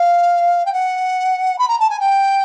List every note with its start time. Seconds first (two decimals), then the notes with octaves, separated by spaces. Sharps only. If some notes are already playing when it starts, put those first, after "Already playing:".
Already playing: F5
0.66 G5
0.73 F#5
1.59 B5
1.68 A#5
1.80 A5
1.90 G#5
2.00 G5